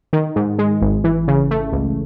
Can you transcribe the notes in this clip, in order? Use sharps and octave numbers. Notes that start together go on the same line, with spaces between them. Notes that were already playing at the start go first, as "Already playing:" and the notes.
D#3
G#2
G#3
G#1
E3
C#3
A3
C#2